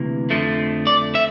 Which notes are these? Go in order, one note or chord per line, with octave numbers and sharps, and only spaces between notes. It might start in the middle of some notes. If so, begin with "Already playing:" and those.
Already playing: D2 C3 E3 A#3
F2 D3 F3 A3
D5
E5